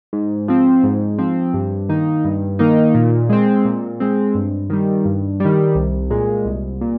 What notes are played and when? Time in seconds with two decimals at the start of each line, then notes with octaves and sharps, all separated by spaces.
0.13 G#2
0.48 F3 C4
0.84 G#2
1.19 F3 C4
1.54 G2
1.89 D#3 A#3 D#4
2.25 G2
2.59 D#3 A#3 D#4
2.95 A#2
3.29 G#3 C4
3.65 A#2
4.00 G#3 C4
4.35 G2
4.70 D#3 G3
5.05 G2
5.40 D#3 G3
5.75 C2
6.10 A#2 G#3
6.45 C2
6.81 A#2